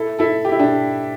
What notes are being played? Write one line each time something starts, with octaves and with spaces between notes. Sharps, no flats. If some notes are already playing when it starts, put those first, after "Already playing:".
Already playing: E4 A4
E4 A4
G4
E4
D4 G4